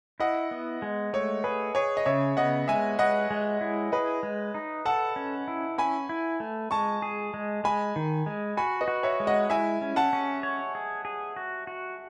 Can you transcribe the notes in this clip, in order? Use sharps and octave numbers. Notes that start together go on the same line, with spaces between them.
E4 D#5 F#5
B3
G#3
A3 C#5
G#4 B4
G#4 C#5
D#5
C#3 C#5 E5
B3 D#5 F#5
G#3 E5 G#5
B4 D#5 F#5
G#3
E4
G#4 B4 D#5
G#3
D#4
A4 F#5 A5
C#4
E4
C#4 G#5 B5
E4
A3
G#3 A5 C#6
G#4
G#3
G#3 G#5 B5
D#3
G#3
F#4 G#5 B5
B4 D#5
F#4
C#5 E5
G#3
D#5 F#5
E4 E5 G#5
C#4
F#5 A5
C#4
C#5
G#4
G#4
F#4
F#4